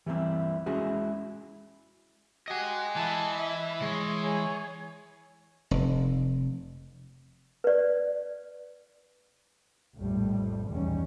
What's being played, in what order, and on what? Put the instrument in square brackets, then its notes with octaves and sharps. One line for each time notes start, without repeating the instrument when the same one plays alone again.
[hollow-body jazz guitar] E3 G3 A#3 C4 E4
G#3 C#4 E4 F#4 G#4
[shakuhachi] F#4 [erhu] G4 [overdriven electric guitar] D#5 G#5
[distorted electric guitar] E3 [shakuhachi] E4 [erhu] A5
[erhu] E5
[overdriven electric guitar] G#3 [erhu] C#5
[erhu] G#4 [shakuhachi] C#5
[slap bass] F1
[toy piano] B4 D5
[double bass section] A#1 F2 A2 G3 A3
E2 G2 B2 D#3 G3 C#4